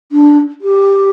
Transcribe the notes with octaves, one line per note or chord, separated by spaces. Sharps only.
D4
G4